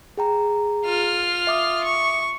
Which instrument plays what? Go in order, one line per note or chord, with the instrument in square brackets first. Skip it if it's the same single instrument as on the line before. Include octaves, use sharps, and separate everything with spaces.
[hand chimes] G#4 G5 A#5
[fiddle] F4 F6
[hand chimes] E5 D6 D#6
[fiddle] C#6